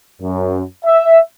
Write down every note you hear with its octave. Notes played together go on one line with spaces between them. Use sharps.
F#2
E5